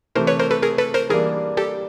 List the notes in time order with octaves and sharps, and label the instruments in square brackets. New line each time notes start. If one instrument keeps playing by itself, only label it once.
[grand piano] C3 E3 A3 [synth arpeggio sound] A#4 C5
[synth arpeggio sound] B4 C#5
A#4 C5
A4 B4
G#4 A#4
A4 B4
A#4 C5
[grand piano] E3 G3 A#3 D4 [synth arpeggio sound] G#4 A#4
[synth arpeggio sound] G4 A4